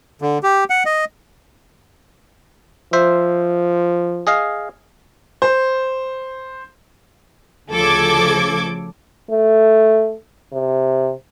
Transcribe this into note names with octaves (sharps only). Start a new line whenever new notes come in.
D3
G4
F#5
D#5
F3 C5 E5
G#4 D#5 F5
C5
D2 C#3 F3 A4 D6 G#6
A3
C3